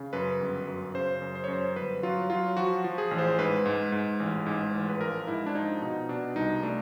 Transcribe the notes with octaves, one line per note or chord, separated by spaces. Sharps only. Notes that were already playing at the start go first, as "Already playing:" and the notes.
Already playing: C#3
F#2 B4
G1
F#2
C#3 C5
F#2
C5
C#5
F#2
C5
G1 B4
F#3 F4
F#3 F4
F3 F#4
F3
G#4
A1
C5
G#2 B4
G#2
G#2
A1
G#2
A1
B4
F3 A#4
G#2 E4
D4
F3 D#4
B2 D#4
B2 D4
C2 D#4
A3 D4